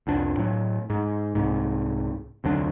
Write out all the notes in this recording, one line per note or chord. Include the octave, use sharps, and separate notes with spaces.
C2 F2 D4
A2 F#3
G#2
C2 G#2
F1 D2 F#3 D4